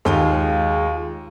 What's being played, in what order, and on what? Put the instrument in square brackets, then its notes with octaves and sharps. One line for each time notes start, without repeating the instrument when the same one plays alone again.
[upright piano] D#2 [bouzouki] F#3 F4 F5 [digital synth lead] G#3